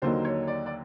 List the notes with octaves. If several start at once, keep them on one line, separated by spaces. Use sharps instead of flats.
D#2 D3 F#3 A#3 D#4 C5
C#5
D5
D5